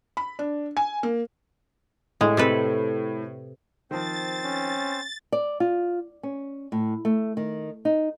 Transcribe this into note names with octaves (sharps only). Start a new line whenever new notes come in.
B5
D4
G#5
A#3
A2 G#3
C3 A4 B4
D#3 F3 C4 C5 A6
C#4
D5
F4
C#4
A2
A3
D#3
D#4